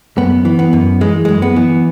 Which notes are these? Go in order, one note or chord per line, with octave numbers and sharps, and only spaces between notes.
F#2 B3
E3
B3
F#2
E3 G#3
F#2 G#3
B3
E3